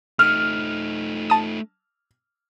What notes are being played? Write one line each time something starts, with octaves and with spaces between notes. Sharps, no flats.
A3 D#4 F6
A5 D#6